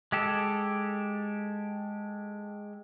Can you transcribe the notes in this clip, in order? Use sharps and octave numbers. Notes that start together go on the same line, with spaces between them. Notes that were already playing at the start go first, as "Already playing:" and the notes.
G#3 G4 A4